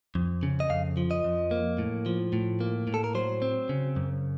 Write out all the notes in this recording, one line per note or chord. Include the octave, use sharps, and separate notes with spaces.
F2
C#3
D#5
F2 F5
F3
D#5
F2
A#3
A2
F3
A2
A#3
A2
A4
A#4
F#3 C5
C4
C#3
F#2